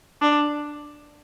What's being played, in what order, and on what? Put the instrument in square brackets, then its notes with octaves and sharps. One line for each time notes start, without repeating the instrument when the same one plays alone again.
[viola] D4